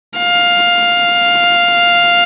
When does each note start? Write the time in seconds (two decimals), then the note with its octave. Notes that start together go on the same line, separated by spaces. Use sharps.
0.19 F5